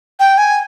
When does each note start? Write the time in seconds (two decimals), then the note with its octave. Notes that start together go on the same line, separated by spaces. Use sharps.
0.20 G5
0.38 G#5